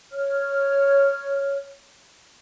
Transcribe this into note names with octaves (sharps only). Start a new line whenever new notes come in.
C#5 F6